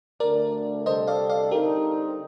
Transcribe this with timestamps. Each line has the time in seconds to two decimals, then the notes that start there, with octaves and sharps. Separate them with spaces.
0.20 D2 D3 A3 D4 A#4 D5
0.86 C3 G3 D4 A4 C5 D#5
1.08 D5 F5
1.30 D5 F5
1.51 D3 G3 C4 D#4 G4 A#4